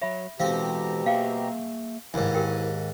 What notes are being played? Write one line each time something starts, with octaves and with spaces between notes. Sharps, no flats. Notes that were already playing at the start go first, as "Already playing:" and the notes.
F#3 C#5 E5 B5
B2 E3 G#3 C4 G4 A4 F5 A#5
A#3 G#4 E5 F5 G5
D#2 G#2 E4 B4 C5 G#5
G4 A#4 G5